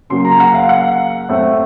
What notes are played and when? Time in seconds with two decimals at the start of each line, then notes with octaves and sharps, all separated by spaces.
0.10 C#3 F#3 A#3 C6
0.25 A#5
0.40 F#5
0.54 F5
0.69 F#5
1.29 A2 A3 C4